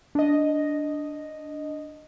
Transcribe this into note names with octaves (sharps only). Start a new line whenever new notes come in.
D4 D#5